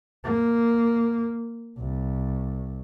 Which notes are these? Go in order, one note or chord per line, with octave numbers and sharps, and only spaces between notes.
A#3
C2